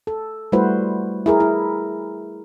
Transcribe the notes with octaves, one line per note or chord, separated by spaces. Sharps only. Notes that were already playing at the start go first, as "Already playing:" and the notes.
A4
G3 A3 E4 F#4 B4 C5
E4 G#4 A#4
E4